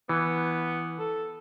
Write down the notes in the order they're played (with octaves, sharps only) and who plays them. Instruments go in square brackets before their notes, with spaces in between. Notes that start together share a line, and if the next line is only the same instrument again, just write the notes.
[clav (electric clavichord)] E3 [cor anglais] B3
[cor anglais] A4